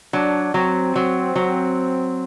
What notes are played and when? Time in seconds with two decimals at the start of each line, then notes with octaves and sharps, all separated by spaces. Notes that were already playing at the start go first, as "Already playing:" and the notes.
0.13 F#3 D4
0.54 F#3 C4
0.96 F#3
1.36 F#3